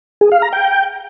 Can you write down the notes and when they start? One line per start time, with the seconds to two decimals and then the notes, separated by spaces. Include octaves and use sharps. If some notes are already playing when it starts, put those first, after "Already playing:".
0.21 G#4
0.32 F5
0.42 A#5
0.53 G5